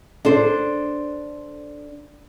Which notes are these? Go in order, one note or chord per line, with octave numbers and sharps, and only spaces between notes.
D4 A4 C5